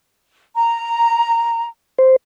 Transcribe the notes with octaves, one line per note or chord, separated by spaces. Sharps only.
A#5
C5